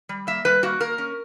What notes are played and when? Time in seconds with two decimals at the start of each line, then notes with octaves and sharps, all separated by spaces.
0.09 G3
0.27 A#3 E5
0.45 G3 B4
0.63 A#3 F#4
0.80 A#3 A#4
0.98 C#4